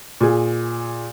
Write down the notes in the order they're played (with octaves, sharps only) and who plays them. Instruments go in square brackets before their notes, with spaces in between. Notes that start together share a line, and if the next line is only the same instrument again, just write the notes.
[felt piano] A#2 G#4